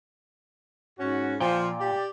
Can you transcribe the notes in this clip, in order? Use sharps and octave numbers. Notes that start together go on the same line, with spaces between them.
G#2 C#4 F#4
A#2 F3 G5
G4 D5